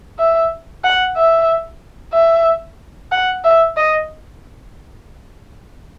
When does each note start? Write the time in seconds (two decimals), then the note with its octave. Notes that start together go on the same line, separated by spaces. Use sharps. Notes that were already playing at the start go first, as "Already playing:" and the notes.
0.19 E5
0.84 F#5
1.17 E5
2.13 E5
3.12 F#5
3.44 E5
3.77 D#5